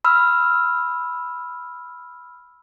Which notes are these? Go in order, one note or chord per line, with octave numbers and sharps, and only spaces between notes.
B5 E6 F6